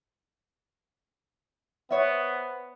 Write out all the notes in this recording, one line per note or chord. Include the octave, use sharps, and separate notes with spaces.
B3 C5 C#5 E5